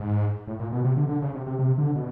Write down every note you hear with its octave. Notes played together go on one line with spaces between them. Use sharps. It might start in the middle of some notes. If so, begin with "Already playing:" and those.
Already playing: G#2
A2
A#2
B2
C3
D3
D3
C#3
C3
C3
C3
D3
B2